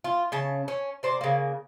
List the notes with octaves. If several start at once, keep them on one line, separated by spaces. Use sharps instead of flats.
F4
C#3 C#4 A5
C#4
C3 C5 D5
C#3 A#3